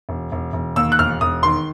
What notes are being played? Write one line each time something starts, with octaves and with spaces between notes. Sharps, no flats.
E1
E1
E1
D#2 E6
F#6
E1 F6
E1 D#6
D#3 C6